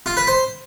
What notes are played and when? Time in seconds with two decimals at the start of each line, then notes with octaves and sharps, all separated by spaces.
0.06 F4
0.17 B4
0.27 C5